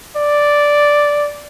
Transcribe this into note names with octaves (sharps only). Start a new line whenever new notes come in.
D5